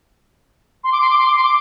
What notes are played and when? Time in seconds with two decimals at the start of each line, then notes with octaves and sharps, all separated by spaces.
0.84 C6
0.92 D6
1.01 C6
1.10 D6
1.18 C6
1.27 D6
1.35 C6
1.44 D6